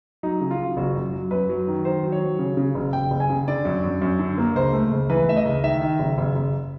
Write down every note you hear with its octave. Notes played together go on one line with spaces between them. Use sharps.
F#3 D#4
C#3
F4
F#3
F#1 F#4
F#2
F#3
F#2 B4
F#3
D#3
D#3 C5
F#3
C#5
F#3
C#3
C#3
F#1
F#1 G5
F#1
G#5
C#3
D3 D5
F#2
F#2
F#2
D3
A#3
C#2 C5
A3
C#2
E3 B4
A3 E5
D#5
C#2
D#3 E5
D#3
F#1
F#1
F#1